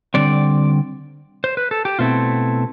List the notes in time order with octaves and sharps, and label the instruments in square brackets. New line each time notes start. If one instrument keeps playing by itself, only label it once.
[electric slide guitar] D3 G3 C4 D5
C5
B4
A4
G4
B2 A3 C4 E4 F4